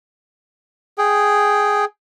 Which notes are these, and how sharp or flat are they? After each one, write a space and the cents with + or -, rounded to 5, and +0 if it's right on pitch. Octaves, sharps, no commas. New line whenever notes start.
G#4 +0 G5 +0